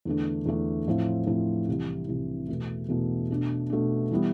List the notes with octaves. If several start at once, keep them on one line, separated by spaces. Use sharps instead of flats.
E2 D3 A3 D4
E2 D3 A3 D4
A2 F3 C4 E4
A2 F3 C4 E4
C2 C3 E3
C2 C3 E3
E2 B2 A3
E2 B2 A3
B2 A3 D4
B2 A3 D4
E3 G3 B3 E4